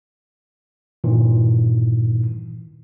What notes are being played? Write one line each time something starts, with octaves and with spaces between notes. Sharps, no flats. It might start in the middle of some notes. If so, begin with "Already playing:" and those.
G2 A#2 D#3 E3